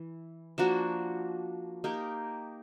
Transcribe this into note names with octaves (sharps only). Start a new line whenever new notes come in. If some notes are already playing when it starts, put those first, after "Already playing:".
Already playing: E3
F3 A#3 D4 F#4
A#3 D#4 G4 A#4